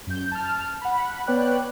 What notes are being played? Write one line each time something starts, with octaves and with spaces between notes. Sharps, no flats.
F#2 G6
A5 F6
F#5 B5
B3 B4 C#5 D5 G5 F#6